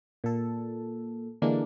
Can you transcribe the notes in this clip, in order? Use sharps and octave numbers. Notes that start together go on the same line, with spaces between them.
A#2 A4
D3 E3 G#3 A#3 D4